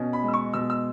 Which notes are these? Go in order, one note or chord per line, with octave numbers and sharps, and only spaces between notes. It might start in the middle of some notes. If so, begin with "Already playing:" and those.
Already playing: B2 C#4
B5
G#3
E6
C#6
B2 E6
E6